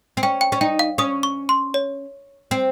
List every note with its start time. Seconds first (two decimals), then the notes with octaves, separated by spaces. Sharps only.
0.17 C4
0.23 C#4 G5
0.41 G5
0.52 C#4
0.61 D#4 G5
0.79 F5
0.98 C#4 D#6
1.23 C#6
1.49 C6
1.74 C#5
2.51 C4